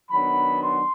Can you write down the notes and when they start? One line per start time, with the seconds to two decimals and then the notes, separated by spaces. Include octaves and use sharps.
0.11 D#3 F#3 B3 D4 B5
0.62 C6